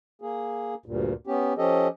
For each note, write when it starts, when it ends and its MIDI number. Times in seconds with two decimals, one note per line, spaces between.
0.22 0.74 58
0.22 0.74 68
0.86 1.14 38
0.86 1.14 43
0.86 1.14 46
1.27 1.53 59
1.27 1.53 61
1.27 1.53 67
1.58 1.88 53
1.58 1.88 61
1.58 1.88 67
1.58 1.88 69
1.58 1.88 75